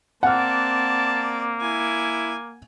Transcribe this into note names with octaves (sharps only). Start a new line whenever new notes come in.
A#3 C4 D5 F#5 A5 F6
E4 G#5